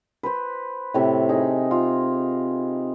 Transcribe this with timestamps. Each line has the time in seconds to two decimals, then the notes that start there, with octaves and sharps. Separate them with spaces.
0.23 B4 C5
0.94 A2 C3
1.29 D#4 G#4
1.71 F4